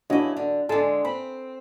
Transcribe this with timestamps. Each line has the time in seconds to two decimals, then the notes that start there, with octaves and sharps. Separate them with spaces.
0.10 C#3 D4 E4 F#4 D#5
0.37 D3
0.69 D3 G#3 A4 A5
1.05 C4 B5